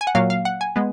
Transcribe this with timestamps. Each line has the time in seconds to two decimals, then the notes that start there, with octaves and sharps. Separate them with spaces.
0.01 G#5
0.07 F#5
0.15 A#2 F#3 A#3 F5
0.30 F5
0.45 F#5
0.61 G#5
0.76 G#3 B3